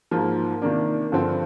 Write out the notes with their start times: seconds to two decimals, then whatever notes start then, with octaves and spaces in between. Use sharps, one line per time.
0.11 G#2 F3 A#3 F4
0.62 C3 D#3 A#3 D4
1.12 G2 D3 F3 C4